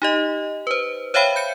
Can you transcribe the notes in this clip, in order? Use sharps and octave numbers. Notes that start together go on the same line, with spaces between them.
D#4 G4 D#5
B4 C5
C5 C#5 E5 F5 G5 B5
G6 C#7